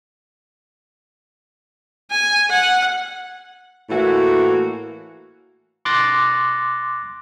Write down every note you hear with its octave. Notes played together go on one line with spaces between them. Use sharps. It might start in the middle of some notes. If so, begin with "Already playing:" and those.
G#5
F#5
A2 E3 A#3 E4 F#4
C6 D6 F#6 A6 A#6